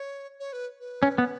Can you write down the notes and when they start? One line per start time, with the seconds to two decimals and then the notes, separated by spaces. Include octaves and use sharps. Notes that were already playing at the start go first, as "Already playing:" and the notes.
Already playing: C#5
0.40 C#5
0.52 B4
0.80 B4
1.03 C#4
1.18 B3